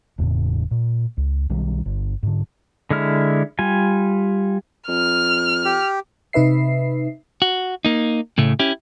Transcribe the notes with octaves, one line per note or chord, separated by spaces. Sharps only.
E1 E2 A2 C#3
A#2
C#2
B1 D#3 G3
G1
G#2 D3
D3 G#3 E4 F6
G3 F4 G#5
F2 F6
G4
C3 D#4 B4 E5 C7
F#4
A#3 D#4
A2 C#3 A3
C#4 E4 G4